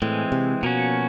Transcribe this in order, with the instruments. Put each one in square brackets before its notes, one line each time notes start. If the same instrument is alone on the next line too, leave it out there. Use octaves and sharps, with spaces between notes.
[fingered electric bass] A2 [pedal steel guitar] E3 G#3 C4
[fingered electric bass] C3
[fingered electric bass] B2 [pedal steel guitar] F3 A#3 C#4 F#4